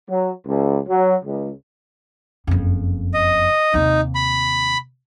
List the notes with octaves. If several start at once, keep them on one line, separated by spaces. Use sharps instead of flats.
F#3
C#2
F#3
C#2
F#1 F2
D#5
D#2 C3 D#4
B5